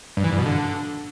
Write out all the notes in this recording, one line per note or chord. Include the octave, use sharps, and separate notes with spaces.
G2
E3
G2
B2
D3